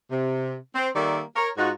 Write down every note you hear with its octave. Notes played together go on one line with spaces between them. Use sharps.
C3
C4
D#3 G3 A#3 A4 D5 E5
A#4 C#5
G#2 D#4 F4 F#4